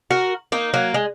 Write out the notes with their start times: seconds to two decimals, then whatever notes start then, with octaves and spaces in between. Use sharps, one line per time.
0.11 F#4 A#4
0.52 A#3 D#4
0.74 F#3 A#3
0.94 G#3